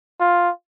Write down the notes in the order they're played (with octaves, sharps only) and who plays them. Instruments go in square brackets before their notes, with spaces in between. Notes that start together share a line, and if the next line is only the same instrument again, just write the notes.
[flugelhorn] F4